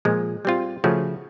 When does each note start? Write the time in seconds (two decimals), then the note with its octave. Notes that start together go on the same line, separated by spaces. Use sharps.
0.05 A#2 F3 G#3
0.45 G3 C4 F4
0.84 C#3 F3 A3 C#4 F#4